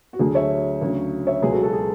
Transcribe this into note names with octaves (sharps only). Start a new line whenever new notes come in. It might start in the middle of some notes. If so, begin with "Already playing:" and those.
F#4
D2 D3 F#3 G#4
C#5 E5
D2 C#3 F#3
C#5 E5
C#2 B2 F#3 G#4 B4
F#4 A4
F#4 A4
G#4